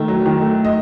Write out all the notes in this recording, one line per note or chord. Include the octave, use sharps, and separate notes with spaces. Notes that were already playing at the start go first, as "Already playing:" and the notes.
Already playing: D#3 A3
F#3
D#3
A3
D#5